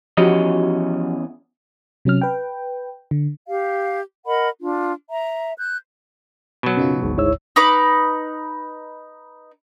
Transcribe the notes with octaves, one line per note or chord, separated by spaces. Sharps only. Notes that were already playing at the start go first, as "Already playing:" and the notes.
E2 F3 C#4 F#4 G4 D#5
C3 F#3 C#4 F6
B4 G5
D3
G4 F5
A#4 D#5 F#5 B5
D4 F4
E5 A#5
F#6 G6
B2 F#3
F#2 C#3 D#4 F4
G#1 D2 G#2
G#2 E4 C#5 E6
D#4 B4 B5 D6